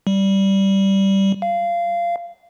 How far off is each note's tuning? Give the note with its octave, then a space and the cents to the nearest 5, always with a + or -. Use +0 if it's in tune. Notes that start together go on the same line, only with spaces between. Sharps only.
G3 -10
F5 -20